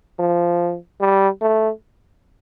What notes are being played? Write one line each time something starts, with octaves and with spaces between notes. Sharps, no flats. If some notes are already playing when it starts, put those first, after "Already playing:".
F3
G3
A3